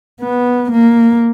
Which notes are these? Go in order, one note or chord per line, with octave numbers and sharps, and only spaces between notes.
B3
A#3